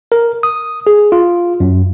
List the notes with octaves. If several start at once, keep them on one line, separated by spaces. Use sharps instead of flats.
A#4
D#6
G#4
F4
F#2